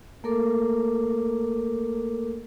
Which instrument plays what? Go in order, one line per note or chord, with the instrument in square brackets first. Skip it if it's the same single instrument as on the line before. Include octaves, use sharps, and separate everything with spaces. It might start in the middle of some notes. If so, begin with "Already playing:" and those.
[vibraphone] A3 A#3 A4 A#4 D6